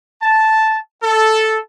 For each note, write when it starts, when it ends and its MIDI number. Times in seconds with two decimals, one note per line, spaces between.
0.22 0.77 81
1.03 1.60 69